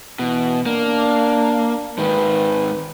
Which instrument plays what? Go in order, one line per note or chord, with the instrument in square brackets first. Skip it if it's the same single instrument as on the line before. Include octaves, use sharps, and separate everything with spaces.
[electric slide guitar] B2 [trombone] E3
[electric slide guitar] A#3 [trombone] D4
[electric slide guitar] G#2 D#3 [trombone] B4